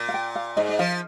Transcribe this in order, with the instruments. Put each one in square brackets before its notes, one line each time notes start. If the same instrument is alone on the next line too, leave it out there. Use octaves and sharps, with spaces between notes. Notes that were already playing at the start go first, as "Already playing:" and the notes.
Already playing: [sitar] A#2
[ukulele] F5
G5
F5
[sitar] G#2 [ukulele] D#5
[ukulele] D#5
[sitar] F3 [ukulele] F5